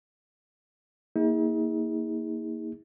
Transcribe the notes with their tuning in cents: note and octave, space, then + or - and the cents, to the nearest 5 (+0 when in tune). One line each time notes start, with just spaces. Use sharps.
A#3 +0 D#4 +45 G#4 -25